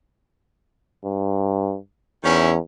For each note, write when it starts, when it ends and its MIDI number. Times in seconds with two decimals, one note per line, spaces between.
1.05 1.77 43
2.24 2.58 40
2.24 2.51 51
2.24 2.51 61
2.24 2.51 64